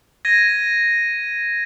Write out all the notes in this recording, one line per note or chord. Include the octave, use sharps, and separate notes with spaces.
G#6 A#6 D#7